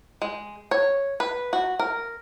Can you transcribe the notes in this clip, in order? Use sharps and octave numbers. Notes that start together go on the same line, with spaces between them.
G#3
C#5
B4
F#4
A#4